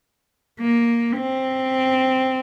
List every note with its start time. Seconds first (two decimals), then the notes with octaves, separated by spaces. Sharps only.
0.61 A#3
1.17 C4